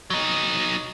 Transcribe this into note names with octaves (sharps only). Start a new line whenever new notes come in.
F#3 D#4